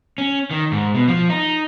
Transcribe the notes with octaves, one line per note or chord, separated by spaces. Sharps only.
C#4
D#3
G#2
B2
F3
D#4